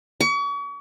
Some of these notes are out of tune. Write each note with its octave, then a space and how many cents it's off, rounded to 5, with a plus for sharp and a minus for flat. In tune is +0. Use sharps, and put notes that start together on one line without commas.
C#6 +40